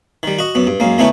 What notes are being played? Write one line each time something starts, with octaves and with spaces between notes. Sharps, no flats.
D#3 G3
F#4 D#5
F#2 B3
G2
F#2 G#3 A#3
D3 A3 B3 C#4 D#4 E4